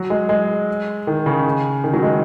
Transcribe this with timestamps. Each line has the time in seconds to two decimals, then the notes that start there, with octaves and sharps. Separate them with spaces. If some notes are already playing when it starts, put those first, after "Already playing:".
Already playing: F#3
0.10 G#3
0.29 G#3
1.07 D#3
1.26 C#3
1.84 D#3
1.93 F#3
2.03 G#3